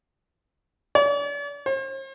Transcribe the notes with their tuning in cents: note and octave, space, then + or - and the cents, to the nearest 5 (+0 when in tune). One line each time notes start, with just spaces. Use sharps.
D5 -45
C5 +45